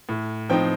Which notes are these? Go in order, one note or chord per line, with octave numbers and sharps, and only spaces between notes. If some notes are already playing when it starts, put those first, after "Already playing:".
A2
F3 C4 D#4 G5